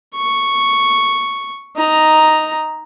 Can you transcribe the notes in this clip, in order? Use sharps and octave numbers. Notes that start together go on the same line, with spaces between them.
C#6
D#4 A#5